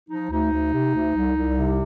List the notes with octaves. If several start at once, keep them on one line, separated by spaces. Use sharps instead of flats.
F3 D#4
D2 D#4
D2
C3
D2
C2
C2
C3